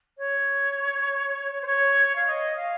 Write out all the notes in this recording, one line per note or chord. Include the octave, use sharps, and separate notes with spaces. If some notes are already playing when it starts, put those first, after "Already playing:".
C#5
C5
C#5
F5
D#5
F5